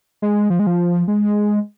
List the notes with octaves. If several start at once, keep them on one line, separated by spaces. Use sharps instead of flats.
G#3
F3
G#3
F3
G#3